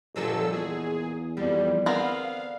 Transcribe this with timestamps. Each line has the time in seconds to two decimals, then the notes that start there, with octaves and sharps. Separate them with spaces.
0.16 G1 A#2 F3 F#3 G#3 A4 E6
0.52 E2 G#4
1.37 F2 D3 G3
1.86 B3 C4 A#4 F5